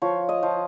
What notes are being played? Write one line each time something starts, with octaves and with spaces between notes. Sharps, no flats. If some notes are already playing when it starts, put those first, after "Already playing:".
F3 C#5
D#5
F3